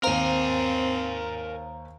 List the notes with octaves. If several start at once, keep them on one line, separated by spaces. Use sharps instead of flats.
D#2 C4 A#4 C5 F5 G#5 A#5